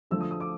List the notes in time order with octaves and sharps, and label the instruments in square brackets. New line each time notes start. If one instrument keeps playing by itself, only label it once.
[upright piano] D3 F3 A3 E6
D#6
D#6
D6